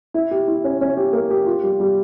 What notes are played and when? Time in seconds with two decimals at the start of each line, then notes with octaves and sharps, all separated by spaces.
0.14 E4
0.31 G4
0.48 E4
0.64 C#4
0.81 C#4
0.97 G4
1.13 A#3
1.31 G4
1.46 F4
1.63 G3
1.80 G3